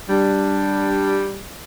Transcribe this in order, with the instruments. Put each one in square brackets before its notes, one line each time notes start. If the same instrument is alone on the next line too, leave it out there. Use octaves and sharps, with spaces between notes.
[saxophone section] G3 [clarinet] D4